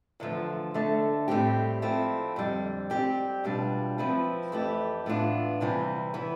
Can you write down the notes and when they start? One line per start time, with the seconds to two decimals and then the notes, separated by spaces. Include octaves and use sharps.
0.20 E2 D3 F3 A3
0.74 D2 D3 A3
1.28 A2 G3 C4 G4
1.82 F3 A3 C4 E4
2.36 F2 D3 G3
2.90 G3 C4 G4 D5
3.44 E2 B2 G3 D4 F4
3.98 F3 C4 E4 B4
4.52 F2 E3 A3 E4 G4
5.06 A2 E3 B3 D4 F4
5.60 E2 C3 E3 G3 C4
6.14 E3 B3